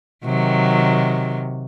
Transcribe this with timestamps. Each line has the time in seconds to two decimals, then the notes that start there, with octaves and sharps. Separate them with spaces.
0.25 C3 D#3 F#3